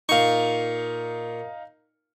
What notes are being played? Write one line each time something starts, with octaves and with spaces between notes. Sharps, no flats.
A#2 D#4 F5 C#6